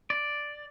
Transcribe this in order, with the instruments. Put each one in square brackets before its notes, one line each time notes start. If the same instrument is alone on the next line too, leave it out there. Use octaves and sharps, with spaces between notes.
[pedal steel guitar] D5